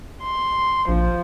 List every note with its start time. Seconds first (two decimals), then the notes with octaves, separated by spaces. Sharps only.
0.23 C6
0.89 A#1 F3